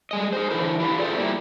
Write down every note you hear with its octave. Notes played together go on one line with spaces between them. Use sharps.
G3 G#3 D#5
G#4 C5
D3 E3 A3 E4 A#4 C5
E4 G4 B4 D5 E5 F5
F4 G#4 A4 C5 D5 E5
G3 A#3 E4 G4